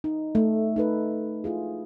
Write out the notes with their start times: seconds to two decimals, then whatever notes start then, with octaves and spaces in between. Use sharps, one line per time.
0.04 D#4
0.35 A3
0.76 D#4 A4 B4
1.44 E4 F4 G#4